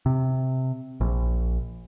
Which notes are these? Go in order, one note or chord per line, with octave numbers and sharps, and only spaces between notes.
C3
A#1